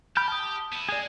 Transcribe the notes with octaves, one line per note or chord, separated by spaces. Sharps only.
G4 B5 F6 G6
A5 D#6
B3 E4
G#3 G#4 D5